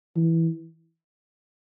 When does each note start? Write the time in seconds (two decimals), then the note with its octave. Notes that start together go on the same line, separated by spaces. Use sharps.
0.16 E3